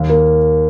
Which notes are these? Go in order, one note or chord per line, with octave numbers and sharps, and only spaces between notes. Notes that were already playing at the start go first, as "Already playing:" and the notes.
Already playing: D#2
A#3